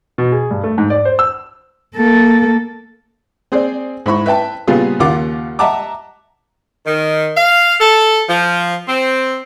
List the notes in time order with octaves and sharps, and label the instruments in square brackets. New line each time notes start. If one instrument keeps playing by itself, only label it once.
[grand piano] B2
G#4
G2
A3
G#2
D5
C5
E6
[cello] A#3 A4
[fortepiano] C4 G#4 C5 D5
G#2 E4 B5 C#6
B4 E5 G5 A5
A#2 C#3 G3 B3 F4 G#4
D#2 C#3 A#3 F4 F#5 D6
D#5 E5 F#5 A5 A#5 D6
[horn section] D#3
F5
A4
F3
C4